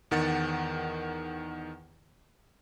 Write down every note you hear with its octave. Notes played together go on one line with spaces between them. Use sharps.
E2 D#3 F#5 A6 C#7